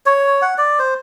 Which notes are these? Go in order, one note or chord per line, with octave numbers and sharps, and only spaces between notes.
C#5
F#5
D5
C5